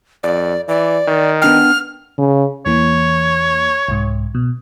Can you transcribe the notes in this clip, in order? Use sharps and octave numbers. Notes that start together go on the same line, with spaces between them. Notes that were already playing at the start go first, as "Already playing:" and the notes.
F2 D5
E3 D5
D#3
B3 D4 G5 F6
C#3
E2 E3 A#3 C#5
C2 G#2
B2